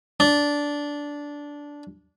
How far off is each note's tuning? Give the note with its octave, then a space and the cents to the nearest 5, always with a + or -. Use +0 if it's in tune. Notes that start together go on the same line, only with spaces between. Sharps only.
D4 -10